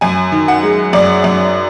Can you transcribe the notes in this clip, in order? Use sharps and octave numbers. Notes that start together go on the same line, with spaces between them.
F#2 G#5
D#3
F#5
G#3
F#2 D5
F#2